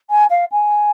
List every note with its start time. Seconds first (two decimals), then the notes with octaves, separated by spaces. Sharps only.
0.10 G#5
0.30 F5
0.52 G#5